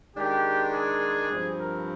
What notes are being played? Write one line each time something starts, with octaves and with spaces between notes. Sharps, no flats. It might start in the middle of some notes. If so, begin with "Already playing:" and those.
D#3 G#3 D4 G4
G#4
G2 F3 C4
A#4